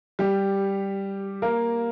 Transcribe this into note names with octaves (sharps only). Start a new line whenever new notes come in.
G3 G4
A#3 A#4